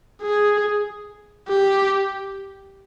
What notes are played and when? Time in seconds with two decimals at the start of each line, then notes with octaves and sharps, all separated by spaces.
0.22 G#4
1.48 G4